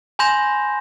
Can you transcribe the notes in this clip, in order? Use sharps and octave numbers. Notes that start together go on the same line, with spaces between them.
G#5 B5 C6 G6 A#6 E7